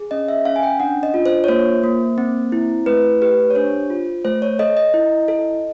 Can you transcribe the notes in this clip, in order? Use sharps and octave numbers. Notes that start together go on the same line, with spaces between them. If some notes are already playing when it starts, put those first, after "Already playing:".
Already playing: G#4
C#4 D#5
E5
C#4 F5
G#5
G5
D4 F#5
D#5
F4
C5
C#5
A#3 C5
A#3
C4
E4
A3 B4
G4 B4
C#5
D4 C5
F4
A3 C5
C#5
A4 D#5
D#5
E4
A4